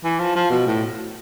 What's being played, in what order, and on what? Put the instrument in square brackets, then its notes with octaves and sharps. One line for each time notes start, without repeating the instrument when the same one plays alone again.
[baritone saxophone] E3
F3
F3
B2
A2